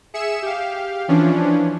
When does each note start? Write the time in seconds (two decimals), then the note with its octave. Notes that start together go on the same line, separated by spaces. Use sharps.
0.14 G#4 E5 C#7 E7
0.42 G4 F5
1.08 E3 F3 C#4 D4